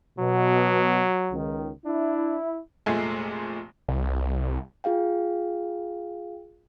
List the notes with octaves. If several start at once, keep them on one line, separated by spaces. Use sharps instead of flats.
B2 F#3
C#2 D#3
D4 E4
F1 A#2 G#3 A3 G#5 C7
C2
F4 G#4 F5 G5